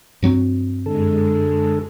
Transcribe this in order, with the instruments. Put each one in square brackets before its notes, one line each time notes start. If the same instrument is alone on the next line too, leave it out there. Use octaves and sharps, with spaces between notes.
[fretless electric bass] G2 F#3 C4
[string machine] F#2 G#3 [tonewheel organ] D3 A4